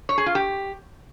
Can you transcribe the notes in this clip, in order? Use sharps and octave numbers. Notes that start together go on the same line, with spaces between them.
C#5
G#4
F4
G4